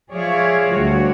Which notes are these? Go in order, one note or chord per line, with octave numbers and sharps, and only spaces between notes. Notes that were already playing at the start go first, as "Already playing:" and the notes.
F3 G#4 C#5 D5 E5 F5
D2 G3 F#4 C#5